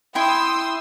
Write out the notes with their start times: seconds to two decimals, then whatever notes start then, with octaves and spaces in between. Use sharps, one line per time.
0.15 E4 G5 C6 D#6 E6